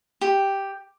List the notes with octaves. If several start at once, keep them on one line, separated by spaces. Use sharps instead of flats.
G4